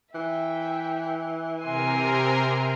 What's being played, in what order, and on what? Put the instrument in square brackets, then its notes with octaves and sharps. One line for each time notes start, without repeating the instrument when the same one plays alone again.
[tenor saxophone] E3 [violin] E5 G5
[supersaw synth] C3 A#4 [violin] G#5 C6